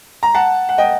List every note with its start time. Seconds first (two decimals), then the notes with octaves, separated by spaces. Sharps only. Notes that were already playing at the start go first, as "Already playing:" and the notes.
0.23 A#5
0.34 F#5 A5
0.69 F#5
0.78 D#5 G5